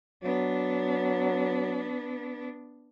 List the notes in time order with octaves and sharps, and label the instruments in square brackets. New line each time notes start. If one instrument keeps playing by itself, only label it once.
[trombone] F#3 [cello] B3 D4